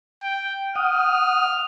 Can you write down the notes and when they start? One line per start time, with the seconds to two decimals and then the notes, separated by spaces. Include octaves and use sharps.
0.23 G5
0.76 F#5 D#6 F6